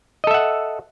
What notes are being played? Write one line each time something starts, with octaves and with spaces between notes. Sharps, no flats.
A4 D#5 E5 F#5